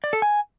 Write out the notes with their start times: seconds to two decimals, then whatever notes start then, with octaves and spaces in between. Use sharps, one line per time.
0.04 D5
0.13 A4
0.22 G#5